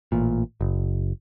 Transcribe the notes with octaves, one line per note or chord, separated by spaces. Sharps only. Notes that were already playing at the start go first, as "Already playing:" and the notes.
A1 A#2
F#1